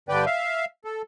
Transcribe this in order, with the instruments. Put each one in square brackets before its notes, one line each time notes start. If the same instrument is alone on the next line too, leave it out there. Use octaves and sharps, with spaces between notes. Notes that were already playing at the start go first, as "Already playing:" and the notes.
[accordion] G2 D3 B4 D5 G5
E5 F5
A4